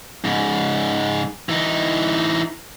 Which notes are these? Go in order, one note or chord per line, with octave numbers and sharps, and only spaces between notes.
G#2 C#3
E3 D#4